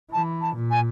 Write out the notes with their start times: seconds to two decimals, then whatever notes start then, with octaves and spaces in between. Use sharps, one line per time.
0.12 E3 A5
0.41 A5
0.56 A#2
0.71 G#5